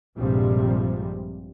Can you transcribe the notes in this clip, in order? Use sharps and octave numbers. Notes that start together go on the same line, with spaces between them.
A#1 G2 C3 F3 G3 G#3